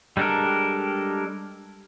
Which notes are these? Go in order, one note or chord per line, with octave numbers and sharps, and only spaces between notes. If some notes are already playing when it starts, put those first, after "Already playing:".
G3 G#3 D4 A4 A#4